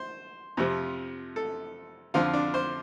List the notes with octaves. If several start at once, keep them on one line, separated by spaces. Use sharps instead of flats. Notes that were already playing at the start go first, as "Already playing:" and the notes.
Already playing: C5
F2 C3 F3
A4
F2 D3 F3 F4
D4
C5